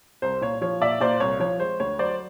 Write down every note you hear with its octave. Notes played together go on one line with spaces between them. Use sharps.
C2 C5
A#2 C#5
F3 C#5
A#2 D5 E5
A#2 C5 D5
C2 C#5
F3 C#5
G#3 C5
D2 C#5
F#3 C5 D5